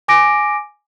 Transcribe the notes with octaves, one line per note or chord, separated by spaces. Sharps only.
G#5 D6 A#6 D7